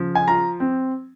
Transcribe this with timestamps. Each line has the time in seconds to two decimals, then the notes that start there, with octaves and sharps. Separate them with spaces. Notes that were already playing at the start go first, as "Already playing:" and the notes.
Already playing: C#3 F3
0.15 G#5
0.28 F4 A#5
0.60 C4